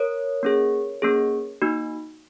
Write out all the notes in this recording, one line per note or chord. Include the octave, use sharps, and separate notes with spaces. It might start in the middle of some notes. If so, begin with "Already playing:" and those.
Already playing: A#4 C#5
A#3 C#4 G#4
A#3 C#4 G#4
A#3 D#4 F#4